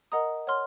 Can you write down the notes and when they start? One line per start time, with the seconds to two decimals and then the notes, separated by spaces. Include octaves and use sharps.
0.12 A#4 D#5 F#5 A#5 D#6
0.47 C#5 F#5 C6 F6